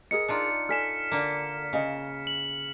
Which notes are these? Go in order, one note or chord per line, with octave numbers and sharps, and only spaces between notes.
G#4 A#4 D#5 C#7
D4 D#4 F4
A4 D5 G#5 F6 B6 E7
D3 A#3
C#3 D#5 F5
F#7